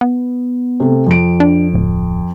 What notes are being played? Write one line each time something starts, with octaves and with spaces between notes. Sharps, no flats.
B3
C3 A3
F2 D7
D4
D1